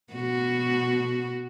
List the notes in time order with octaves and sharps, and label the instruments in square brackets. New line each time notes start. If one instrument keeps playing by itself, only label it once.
[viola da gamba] B2 F#4